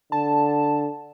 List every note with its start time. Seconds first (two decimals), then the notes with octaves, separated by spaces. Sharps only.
0.12 D3 A5